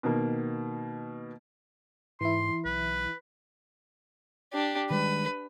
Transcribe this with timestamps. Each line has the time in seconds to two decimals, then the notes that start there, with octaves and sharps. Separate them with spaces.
0.03 B2 D#3 A#3
2.21 G#2 E3 E4 C6
2.65 B1 B4
4.53 D4 G4
4.90 D#3 G3 G#3 B4